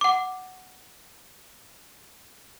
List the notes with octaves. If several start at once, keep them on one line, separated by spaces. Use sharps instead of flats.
F#5 D6